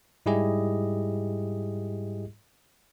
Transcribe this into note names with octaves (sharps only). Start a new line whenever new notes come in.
G#2 G3 E4 G4 G#4 D#5